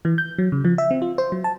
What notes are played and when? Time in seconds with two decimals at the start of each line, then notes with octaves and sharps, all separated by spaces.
0.05 E3
0.18 G6
0.39 F#3
0.52 C#3
0.65 F3
0.78 E5
0.91 C4
1.02 F4
1.18 C5
1.32 F#3
1.44 A5